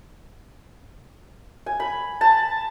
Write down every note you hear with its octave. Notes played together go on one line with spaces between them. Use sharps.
G#5
B5
A5